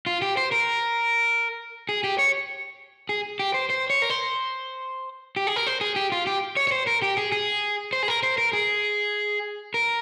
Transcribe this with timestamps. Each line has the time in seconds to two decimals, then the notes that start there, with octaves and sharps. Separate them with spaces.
0.06 F4
0.22 G4
0.37 C5
0.52 A#4
1.89 G#4
2.04 G4
2.19 C#5
3.09 G#4
3.39 G4
3.54 C5
3.70 C5
3.90 C#5
4.02 A#4
4.10 C5
5.36 G4
5.47 G#4
5.56 A#4
5.67 C5
5.81 G#4
5.96 G4
6.12 F4
6.27 G4
6.57 C#5
6.67 C#5
6.72 C5
6.87 A#4
7.02 G4
7.18 G#4
7.32 G#4
7.93 C5
8.03 G#4
8.08 A#4
8.23 C5
8.38 A#4
8.53 G#4
9.74 A#4